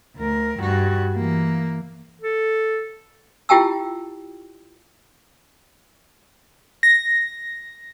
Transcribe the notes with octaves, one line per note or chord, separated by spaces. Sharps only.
D2 A#4
G2 F#4
E3 A#3
A4
E4 F4 G4 G5 A5 E6
A#6